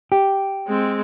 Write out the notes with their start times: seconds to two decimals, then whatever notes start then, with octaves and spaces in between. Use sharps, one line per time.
0.12 G4
0.67 G#3 C4